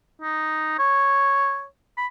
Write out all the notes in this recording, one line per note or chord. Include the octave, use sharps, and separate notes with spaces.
D#4
C#5
B5